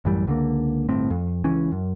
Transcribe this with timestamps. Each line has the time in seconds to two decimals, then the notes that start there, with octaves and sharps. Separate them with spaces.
0.05 A1 F#2 E3 G3
0.27 C#2 D3 A#3
0.89 G1 A2 C4
1.10 F2
1.44 C#2 E3 C#4
1.72 F#2